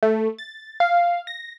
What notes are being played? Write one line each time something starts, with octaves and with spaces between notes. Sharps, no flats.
A3
A6
F5
A#6